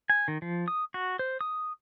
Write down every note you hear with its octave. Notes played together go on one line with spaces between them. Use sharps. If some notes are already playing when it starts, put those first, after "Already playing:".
G#5
D#3
F3
D#6
F#4
C5
D#6